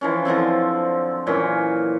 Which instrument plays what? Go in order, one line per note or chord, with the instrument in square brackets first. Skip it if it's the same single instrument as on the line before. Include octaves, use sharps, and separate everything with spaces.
[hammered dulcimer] E3 F3 C#4
D3 F3 F#3 C4
A#2 E3 F#3 C#4